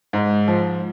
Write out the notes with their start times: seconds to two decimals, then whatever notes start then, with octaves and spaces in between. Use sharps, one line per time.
0.13 G#2
0.48 F3